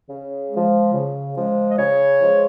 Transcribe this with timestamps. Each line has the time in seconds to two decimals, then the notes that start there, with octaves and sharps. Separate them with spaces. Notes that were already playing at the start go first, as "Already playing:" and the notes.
0.08 C#3
0.50 F3 G#3
0.93 C#3
1.36 F3 G#3
1.71 D#5
1.78 C#3 C#5
2.21 F3 G#3